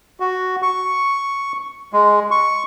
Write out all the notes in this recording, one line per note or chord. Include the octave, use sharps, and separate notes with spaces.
F#4
C#6
G#3
C#6